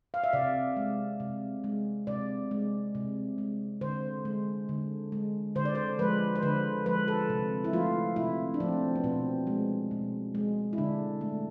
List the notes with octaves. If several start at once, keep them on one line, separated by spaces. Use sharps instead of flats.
F5
E5
C3 D5
G#3
C3
G#3
C3 D5
G#3
C3
G#3
D3 C5
G#3
D3
G#3
D3 C5
D5
C5
F3 G#3 B4
C5
D3 B4
F3 G#3 B4
A4
C3
E4
F3 A3 F4
C3 E4
D4
F3 A3 C4
B3
B2 C4
G#3
B2
G#3
E4
D3 D4
A3